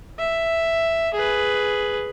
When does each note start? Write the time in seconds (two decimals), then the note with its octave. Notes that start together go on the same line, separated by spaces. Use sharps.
0.19 E5
1.14 G#4 B4